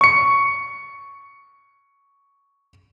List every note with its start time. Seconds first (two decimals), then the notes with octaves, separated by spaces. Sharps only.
0.01 C#6 C#7